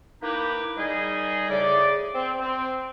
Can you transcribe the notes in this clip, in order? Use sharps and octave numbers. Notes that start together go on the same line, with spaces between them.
A#3 D#4 E4 G4 B4
D#3 G3 D#4 G#4
A2 C#3 D5
C4
C4